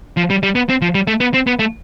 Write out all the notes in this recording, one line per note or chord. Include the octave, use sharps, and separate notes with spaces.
F3
G3
G3
B3
C4
F3
G3
A3
B3
C4
B3
A3